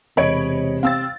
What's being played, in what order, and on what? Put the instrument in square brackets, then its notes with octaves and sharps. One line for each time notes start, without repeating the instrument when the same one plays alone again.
[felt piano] E1 C#5 D#5 [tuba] C3 [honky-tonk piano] B5 G#6 D7
[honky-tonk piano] C4 E6 A6 [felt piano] F5